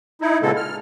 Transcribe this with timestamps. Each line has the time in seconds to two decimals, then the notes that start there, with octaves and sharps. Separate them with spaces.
0.21 D#4 E4
0.42 A#2 C#3 G#3 B3 A4
0.56 F6